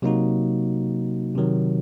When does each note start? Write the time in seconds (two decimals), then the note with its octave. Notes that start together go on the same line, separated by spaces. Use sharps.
0.02 C3 F#3 A#3 D#4 F#4
1.35 C3 D#3 F#3